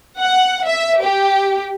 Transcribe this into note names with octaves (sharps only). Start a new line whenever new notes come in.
F#5
E5
G4